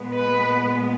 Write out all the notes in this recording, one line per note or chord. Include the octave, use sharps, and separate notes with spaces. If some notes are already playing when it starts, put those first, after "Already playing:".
Already playing: A#2 G#3 B3
B4